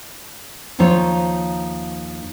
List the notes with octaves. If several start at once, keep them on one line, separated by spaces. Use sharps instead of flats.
D#2 F3 D#4 C5 C#5